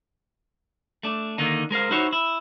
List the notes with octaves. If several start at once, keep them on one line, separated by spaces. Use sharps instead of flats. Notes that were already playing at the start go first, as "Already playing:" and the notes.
A3 D4
D3 D#3 A#3 D#4
G#3 A#4 C5 F5
D#4 E4 F#4 C5 C#5
E4